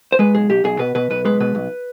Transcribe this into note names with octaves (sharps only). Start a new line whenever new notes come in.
C5
G#3 B4
B1 G#4
B1 G4
B1 G#4
B2 B4
B2 B4
B1 B4
G#3 B4
B2 B4
B1